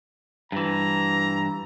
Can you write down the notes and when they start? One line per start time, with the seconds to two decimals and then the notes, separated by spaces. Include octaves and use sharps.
0.52 G2 E3 A#5